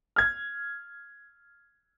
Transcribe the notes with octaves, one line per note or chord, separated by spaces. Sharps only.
F6 G#6